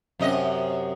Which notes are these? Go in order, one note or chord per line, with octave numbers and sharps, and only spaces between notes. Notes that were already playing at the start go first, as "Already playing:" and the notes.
F#2 C3 D#5